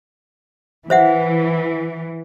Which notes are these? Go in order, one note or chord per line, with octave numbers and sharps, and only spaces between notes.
E3 C5 E5 F#5